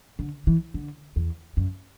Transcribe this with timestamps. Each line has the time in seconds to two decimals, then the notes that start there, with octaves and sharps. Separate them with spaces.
0.19 D3
0.47 E3
0.74 D3
1.16 E2
1.57 F#2